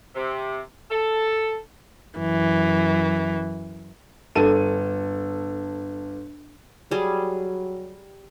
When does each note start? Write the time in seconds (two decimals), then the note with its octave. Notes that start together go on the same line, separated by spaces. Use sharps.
0.16 C3
0.91 A4
2.18 F#2 E3
4.35 G1 A4 D#7
6.91 F#3 G3 G#4